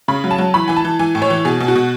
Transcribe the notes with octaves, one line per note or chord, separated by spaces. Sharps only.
C#3 B5
F#3
A5
F#3
E3 B5
E3 G#5
A5
E3
E3 G#5
A2
C#5
E3
B2 G#4
B2
F#4
B2